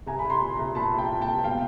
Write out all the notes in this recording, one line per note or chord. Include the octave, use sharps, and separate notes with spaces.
C2 G#5 A#5
B5
C2
A#5 C6
A#2
C2
A#2 A5 B5
C2 G5 A5
A#2
G5 A5
C2
B2 F5 G5